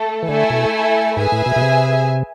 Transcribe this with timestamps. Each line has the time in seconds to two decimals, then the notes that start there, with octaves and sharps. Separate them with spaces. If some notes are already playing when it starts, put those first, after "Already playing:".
Already playing: A3 A4
0.23 E3
0.28 D3 A3 E4 A4 E5 G#5
0.50 B2
1.17 G#2 G#4 B4 E5 G#5
1.32 A2
1.46 B2
1.56 B2
1.61 C3